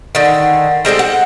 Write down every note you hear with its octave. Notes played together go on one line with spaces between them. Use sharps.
D3 D#3
G3 G#3 C4 A4
F#5